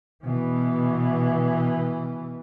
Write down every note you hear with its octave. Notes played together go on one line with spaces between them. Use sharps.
B2 E3